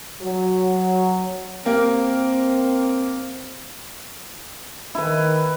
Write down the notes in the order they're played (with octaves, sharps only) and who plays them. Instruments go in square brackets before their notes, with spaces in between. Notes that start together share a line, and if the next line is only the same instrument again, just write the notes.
[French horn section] F#3
[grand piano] A#3 G4 A#4 [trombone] C4
[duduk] D#3 [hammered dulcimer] E4 B4